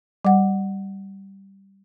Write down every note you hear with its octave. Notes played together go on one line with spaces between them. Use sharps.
G3 F#5